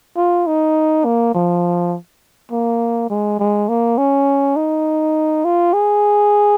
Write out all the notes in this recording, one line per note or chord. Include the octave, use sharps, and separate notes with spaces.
F4
D#4
A#3
F3
A#3
G#3
G#3
A#3
C#4
D#4
F4
G#4